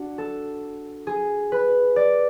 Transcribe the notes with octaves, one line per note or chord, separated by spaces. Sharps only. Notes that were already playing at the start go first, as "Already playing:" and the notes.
Already playing: D4 F#4
A4
G#4
B4
D5